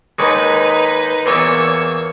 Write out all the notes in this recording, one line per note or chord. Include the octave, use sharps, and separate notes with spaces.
D#2 G#3 D#4 B4 C#6
E2 A#2 C#5 E6